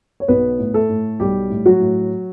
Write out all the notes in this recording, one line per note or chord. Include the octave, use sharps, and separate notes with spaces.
C#5
B1 B3 B4
A2
A3 A4
A2
B1 G3 G4
A2
F#3 F#4
A2